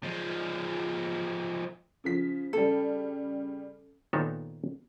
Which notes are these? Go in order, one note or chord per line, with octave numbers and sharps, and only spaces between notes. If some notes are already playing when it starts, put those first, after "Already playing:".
F3 G#3
C#3 F3 B6
C#3 G3 A4
A#2 D#3 B3 D#4 A4 C#5